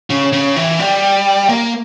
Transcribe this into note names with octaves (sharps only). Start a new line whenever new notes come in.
C#3
C#3
E3
G3
A#3